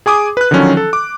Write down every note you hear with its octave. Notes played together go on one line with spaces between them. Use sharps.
G#4 G#5 D6 D#6
B4 F#6
D3 D#3 F3 F#3 C#4
A4
D6